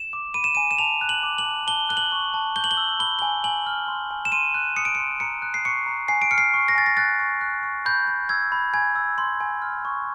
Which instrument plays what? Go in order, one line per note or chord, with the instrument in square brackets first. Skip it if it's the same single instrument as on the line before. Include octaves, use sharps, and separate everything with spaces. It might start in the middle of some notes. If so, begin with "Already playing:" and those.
Already playing: [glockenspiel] E7
D6
B5 D#7
E7
G#5 D#7
E7
A5 F7
F#6
F#7
D6
F#7
A5
A5 G7
F#6 G7
F#7
C#6
A5
G6 G7
F#7
G7
E6
B5 G7
G#5 G7
G#5 F#7
F6
C6
G#5
E7
C6 D#7
F#6
D#6 C#7
D7
C6 C#7
A#5 C#7
F#6
C7
C#6 C#7
A#5
G#5 C7
D7
F6 C#7
C7
C#6
A#6
G#5 A6
A#6
F#6 A6
C#6
F#6
C#6
B5 G6
G6
E6 G#6
B5
G#5 G#6
E6
C6
G#5
F6
C#6